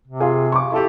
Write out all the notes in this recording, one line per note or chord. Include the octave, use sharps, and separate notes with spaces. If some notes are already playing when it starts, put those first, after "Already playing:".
C3
F4 G#4
C#6 D6
E4 G4 A4